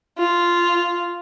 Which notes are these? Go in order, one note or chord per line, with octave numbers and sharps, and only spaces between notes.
F4